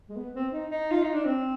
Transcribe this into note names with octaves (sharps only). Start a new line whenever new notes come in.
G#3
B3
C4
D#4
D#4
F4
D#4
D4
C4